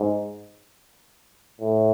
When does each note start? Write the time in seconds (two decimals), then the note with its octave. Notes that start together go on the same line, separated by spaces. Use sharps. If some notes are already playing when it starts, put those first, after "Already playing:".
Already playing: G#2
1.61 A2